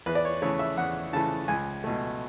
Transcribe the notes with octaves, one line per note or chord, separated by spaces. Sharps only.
E2 B4
D5
C#5
C#3 E3 A3 C#5
E5
E2 F#5
C#3 E3 A3 A5
C#2 G#5
B2 A3